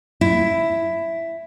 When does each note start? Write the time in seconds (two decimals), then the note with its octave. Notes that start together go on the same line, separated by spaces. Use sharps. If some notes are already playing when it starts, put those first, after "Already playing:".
0.21 E4